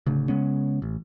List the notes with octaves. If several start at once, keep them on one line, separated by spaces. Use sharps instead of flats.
D1 D2 C#3
C#3 G#3 B3 C#4
A1